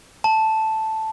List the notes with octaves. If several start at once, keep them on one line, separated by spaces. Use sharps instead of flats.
A5